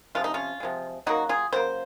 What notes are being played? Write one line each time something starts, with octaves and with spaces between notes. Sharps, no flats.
C3 F3 G#3 F4
D#4
C#4 F4
C3 F3 G#3
C#3 F#3 A#3 D#4 F#4
F4 G#4
C#3 F#3 A#3 C5